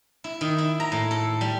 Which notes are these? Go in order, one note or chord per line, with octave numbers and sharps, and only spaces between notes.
E4
D#3
E4
A#5
A2
A4
G3